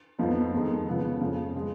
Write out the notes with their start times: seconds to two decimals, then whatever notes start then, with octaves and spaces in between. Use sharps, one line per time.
0.19 F2 F3 B3 D#4
0.52 F2 D#3 G#3
0.87 C#3 F3 B3
1.20 F2 C#3 F3
1.55 C#3 G#3